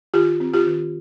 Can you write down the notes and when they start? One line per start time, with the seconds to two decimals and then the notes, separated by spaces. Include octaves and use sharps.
0.14 D#3 F4 G4
0.40 C4
0.53 F4 G4
0.67 D#3